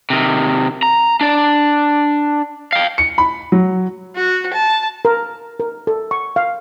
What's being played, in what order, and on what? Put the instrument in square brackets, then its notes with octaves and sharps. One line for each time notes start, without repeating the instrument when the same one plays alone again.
[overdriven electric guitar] C3 D#3
A#5
D4 D5
F5 G5
[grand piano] C#7
B5
F#3
[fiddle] F#4
A5
[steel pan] A#4
A#4
A4
C#6
F5